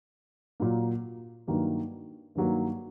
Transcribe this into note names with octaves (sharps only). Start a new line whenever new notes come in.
A#2 F#3 A#3
G2 D#3 F#3 A#3
G2 D#3 F#3 A#3